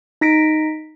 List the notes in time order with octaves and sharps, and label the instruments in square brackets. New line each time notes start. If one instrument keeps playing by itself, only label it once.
[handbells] D#4 A#6 B6 D7